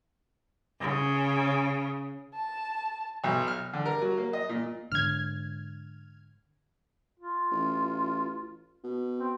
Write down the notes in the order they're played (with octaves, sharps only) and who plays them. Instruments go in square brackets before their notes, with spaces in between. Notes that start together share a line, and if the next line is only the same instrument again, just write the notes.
[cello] C#3
[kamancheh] A5
[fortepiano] B1
F6
D3
A#4
F#3
A#3
D#5
A#2
[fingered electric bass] G#2 D3 [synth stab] F6 G#6
[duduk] F4
[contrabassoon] A1
B2
[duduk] C4